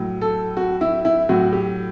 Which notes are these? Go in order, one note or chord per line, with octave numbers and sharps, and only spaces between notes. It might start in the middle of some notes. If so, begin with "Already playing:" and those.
Already playing: A2 F#3
A4
F#4
E4
E4
A2 F#3 F#4
G4